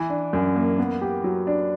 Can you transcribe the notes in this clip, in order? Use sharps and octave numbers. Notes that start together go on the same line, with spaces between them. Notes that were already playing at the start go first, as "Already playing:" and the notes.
Already playing: E3
D4
F#2
A#3
B3
G4
F#3
D4